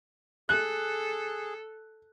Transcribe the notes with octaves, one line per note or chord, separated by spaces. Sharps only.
G#4 A4 F#6